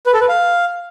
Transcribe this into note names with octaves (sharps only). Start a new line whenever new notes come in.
B4
A4
B4
F5